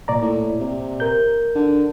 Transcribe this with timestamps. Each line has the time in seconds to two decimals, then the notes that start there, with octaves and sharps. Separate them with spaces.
0.08 A#2 D5 A#5
0.22 A2
0.61 C3
1.00 A#4 G6
1.55 D3